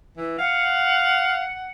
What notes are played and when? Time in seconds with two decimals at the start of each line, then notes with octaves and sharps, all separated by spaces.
0.17 E3
0.39 F5 F#5